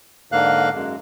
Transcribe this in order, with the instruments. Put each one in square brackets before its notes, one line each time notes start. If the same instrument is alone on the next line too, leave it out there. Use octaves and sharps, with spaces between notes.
[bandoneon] G#2 D3 A#3 F5 F#6
F#2 G#3